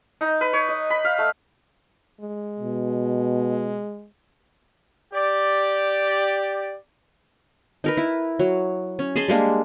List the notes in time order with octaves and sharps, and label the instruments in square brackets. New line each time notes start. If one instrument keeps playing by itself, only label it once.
[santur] D#4
B4
C#5
D#5
B5
F5
A3
[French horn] G#3
[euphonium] B2
[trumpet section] G4 D5
[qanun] D#4 A#4 B4
E4
F#3
C#4
G#4 D#5 A5 C6
G3 G#3 A#3 D4